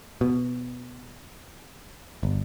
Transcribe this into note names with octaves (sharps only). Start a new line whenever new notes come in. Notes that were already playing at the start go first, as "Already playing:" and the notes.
B2
G1